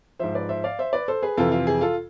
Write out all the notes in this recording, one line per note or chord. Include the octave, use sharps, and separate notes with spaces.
G#2 F3 C5 E5
B4 D5
C5 E5
D5 F5
C5 E5
B4 D5
A4 C5
G#4 B4
F2 C3 E3 F4 A4
F4
G#4
F4 A4